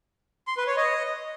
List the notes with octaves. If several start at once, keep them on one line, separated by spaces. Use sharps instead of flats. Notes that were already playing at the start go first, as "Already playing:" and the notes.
C6
B4
C#5
D#5